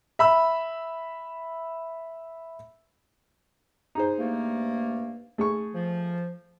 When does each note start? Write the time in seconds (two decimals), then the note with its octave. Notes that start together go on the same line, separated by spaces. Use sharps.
0.19 E5 B5 E6
3.95 D#4 G#4 C5
4.19 G2 A3 A#3
5.38 A3 G#4 C#6
5.74 F3